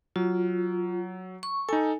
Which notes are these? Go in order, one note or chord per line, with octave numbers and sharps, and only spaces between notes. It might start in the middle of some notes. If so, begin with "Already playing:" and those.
F#3 F4
C#6
D#4 A4 G#5